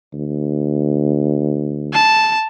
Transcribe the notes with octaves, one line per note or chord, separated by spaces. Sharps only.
D2
A5